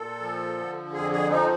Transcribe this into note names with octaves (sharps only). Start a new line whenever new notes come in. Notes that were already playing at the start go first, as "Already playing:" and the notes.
Already playing: A#2 A4
F3
D3
F2 G#4
G#4
F3 D#4